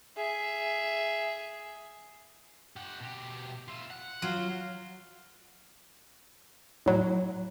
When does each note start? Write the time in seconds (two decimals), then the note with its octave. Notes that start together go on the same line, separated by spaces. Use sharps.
0.17 G#4 E5
2.76 G4 F#5
3.00 B2 G4
3.68 F4 E5
3.90 F#5
4.22 F#3 F4
6.86 A2 F#3